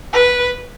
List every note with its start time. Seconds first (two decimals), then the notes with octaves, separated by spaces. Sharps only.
0.13 B4